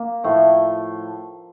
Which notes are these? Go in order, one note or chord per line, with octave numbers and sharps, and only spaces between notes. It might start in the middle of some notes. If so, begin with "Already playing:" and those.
Already playing: A#3
A2 F3 A3